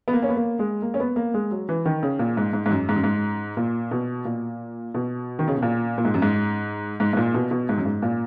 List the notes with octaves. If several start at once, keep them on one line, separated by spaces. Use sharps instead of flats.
B3
A#3
C#4
B3
A#3
G#3
A#3
C#4
B3
A#3
G#3
F#3
E3
D#3
C#3
A#2
G#2
G#2
G#2
F#2
G#2
F#2
G#2
A#2
B2
A#2
B2
D#3
C#3
B2
A#2
A#2
G#2
F#2
G#2
G#2
G#2
A#2
B2
B2
G#2
F#2
G#2
A#2